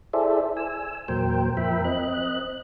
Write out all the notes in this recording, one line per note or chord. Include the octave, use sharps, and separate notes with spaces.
E4 G#4 A4 C5 D5 E5
G#5 E6
E2 A#2 F#3 A#4 C5 G5
F2 F3 A#4 E5 G5 B5
C4 D#5 F#6